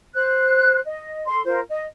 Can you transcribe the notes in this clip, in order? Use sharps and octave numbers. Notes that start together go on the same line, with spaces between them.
C5 F#6
D#5
A4 C6
F4 A#4 C5
D#5